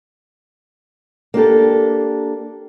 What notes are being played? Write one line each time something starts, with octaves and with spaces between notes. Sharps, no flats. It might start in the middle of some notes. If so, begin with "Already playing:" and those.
A#3 D4 G4 A4